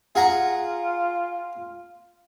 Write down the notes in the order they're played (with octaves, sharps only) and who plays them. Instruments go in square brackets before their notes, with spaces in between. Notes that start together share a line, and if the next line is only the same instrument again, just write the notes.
[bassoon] F4 [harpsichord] G#4 F#5 A#5